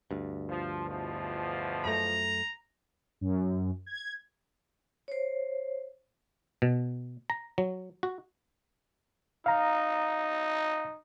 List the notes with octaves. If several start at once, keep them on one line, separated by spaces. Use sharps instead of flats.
D2 G2
F3
E2 B2 F3
F#2 A3 A#5
F#2
G#6
C5 C#5
B2
A#5
F#3
F#4
D#4 F5 A#5